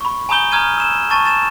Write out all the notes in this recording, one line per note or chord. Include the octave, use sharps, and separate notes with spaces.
B5 C#6
G#5 A#5 B5 D#6 G6 G7
A#5 D#6 F6 G#6 D#7
E6 E7
A5 C#6 A6 D#7
A6 E7